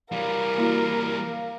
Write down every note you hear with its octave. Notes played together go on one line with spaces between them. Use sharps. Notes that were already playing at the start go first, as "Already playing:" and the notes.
E3 G3 A#4 F5
A#3 E4 F#4